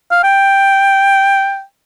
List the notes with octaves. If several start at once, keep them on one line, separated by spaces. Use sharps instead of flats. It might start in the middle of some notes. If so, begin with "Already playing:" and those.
F5
G5